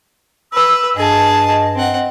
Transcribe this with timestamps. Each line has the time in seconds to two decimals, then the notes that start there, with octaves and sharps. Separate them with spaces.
0.53 B4 E6
0.97 G2 G#4 D#5 A5
1.75 C4 F#5